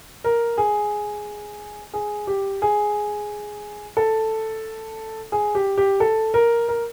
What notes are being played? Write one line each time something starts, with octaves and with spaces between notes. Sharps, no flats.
A#4
G#4
G#4
G4
G#4
A4
G#4
G4
G4
A4
A#4
A#4